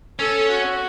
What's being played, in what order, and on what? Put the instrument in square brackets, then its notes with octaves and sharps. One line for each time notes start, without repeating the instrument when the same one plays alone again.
[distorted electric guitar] C#4 [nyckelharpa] A4
[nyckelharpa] F#4